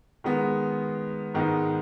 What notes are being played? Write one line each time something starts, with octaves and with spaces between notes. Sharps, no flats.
D#3 G#3 B3
G#2 D#3 G#3 B3 D#4